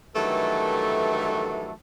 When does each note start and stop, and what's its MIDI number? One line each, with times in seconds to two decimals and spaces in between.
0.15 1.71 43
0.15 1.71 51
0.15 1.71 52
0.15 1.71 54
0.15 1.71 57
0.15 1.71 69